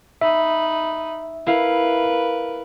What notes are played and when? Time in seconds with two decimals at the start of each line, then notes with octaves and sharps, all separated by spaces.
0.21 D#4 E5 B5
1.47 E4 A#4 B4 F5